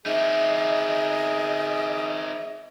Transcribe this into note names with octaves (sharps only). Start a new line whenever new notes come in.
C4 D#4 G#4 D#5 E5